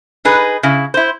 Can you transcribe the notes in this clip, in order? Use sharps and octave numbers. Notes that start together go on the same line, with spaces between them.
D#4 G#4 B4
C#3 E4
E4 C5